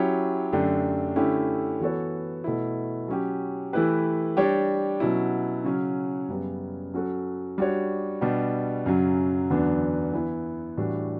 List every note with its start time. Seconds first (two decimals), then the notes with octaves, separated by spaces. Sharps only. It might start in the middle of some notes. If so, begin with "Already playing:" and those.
Already playing: F#3 C#4 E4 G4 C#5
0.53 F#2 D3 A3 D4 G4
1.16 D3 A3 C#4 E4 G4
1.81 E3 B3 F#4 A4 C#5
2.44 B2 A3 E4
3.08 F#3 C#4 G4
3.73 E3 A3 E4 G4 B4
4.37 G3 D4 G4 C#5
5.00 B2 F#3 C#4 E4
5.64 C#3 F#3 C#4
6.28 F#2 C#3 G3 B3
6.94 F#3 C#4 F#4 A4
7.58 G3 D4 F#4 C#5
8.21 B2 G3 D4 G4
8.86 F#2 C#3 F#3
9.50 E2 D3 F#3 B3 D4
10.13 E3 B3 E4
10.77 A2 E3 G3 D4 F#4